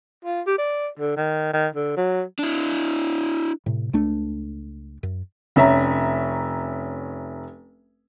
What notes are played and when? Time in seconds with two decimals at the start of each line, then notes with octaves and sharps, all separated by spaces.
0.25 F4
0.46 G4
0.58 D5
0.99 D3
1.16 D#3
1.53 D#3
1.75 D3
1.96 F#3
2.39 D4 E4
3.66 A2 C3
3.93 C#2 A3 D4
5.03 F#2
5.56 F1 C#4 E5 A#5